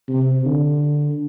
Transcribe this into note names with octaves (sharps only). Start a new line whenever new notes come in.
C3
D3